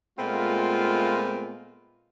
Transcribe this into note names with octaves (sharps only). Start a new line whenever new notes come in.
A#2 G#3 A3 B3 C4 F4